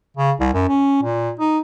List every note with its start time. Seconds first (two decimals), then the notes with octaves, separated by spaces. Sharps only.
0.17 C#3
0.40 C2
0.54 F#2
0.68 C#4
1.03 A#2
1.39 D#4